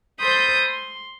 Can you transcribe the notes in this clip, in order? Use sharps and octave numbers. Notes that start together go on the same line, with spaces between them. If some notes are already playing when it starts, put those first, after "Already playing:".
A4 C5 B5 C6 D#6 G6
C6